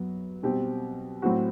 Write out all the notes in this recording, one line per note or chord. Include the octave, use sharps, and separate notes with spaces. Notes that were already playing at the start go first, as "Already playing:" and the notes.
Already playing: F#2 F#3 B3
B2 G3 C4 G4
A2 F#3 C4 F#4